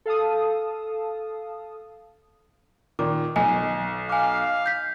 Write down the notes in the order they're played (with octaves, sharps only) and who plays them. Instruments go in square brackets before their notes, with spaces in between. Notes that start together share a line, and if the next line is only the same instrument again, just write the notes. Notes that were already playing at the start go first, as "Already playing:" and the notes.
[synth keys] A4 F5 A5 D#6
[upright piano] A#2 D#3 [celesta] D6
[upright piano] B1 [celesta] G#5
[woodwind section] F5 [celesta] G#5 D6
[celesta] G6 B6